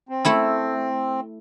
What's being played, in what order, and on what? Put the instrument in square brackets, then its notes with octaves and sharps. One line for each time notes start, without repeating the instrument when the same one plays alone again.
[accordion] C4
[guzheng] A3 E4 A4